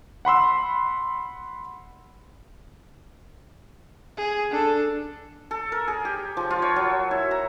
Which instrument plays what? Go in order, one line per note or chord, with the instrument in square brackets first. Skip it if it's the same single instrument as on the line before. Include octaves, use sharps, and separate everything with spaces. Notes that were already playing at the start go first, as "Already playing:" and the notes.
[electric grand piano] F#5 B5 C6 E6
[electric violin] G#4
D4 A4
[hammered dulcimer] A4
A#4
G#4
G4
F3
F4
C#5
F#3
E4
A#5